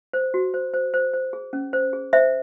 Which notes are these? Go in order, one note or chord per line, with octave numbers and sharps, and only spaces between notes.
C5
F#4
C5
C5
C5
C5
G#4
C#4
C5
G#4
C5 E5